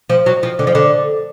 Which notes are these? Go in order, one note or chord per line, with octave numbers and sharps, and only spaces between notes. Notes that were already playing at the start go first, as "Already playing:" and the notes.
F3
F#3
F3
D3
F3
D3